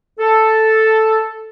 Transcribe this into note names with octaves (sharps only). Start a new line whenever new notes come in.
A4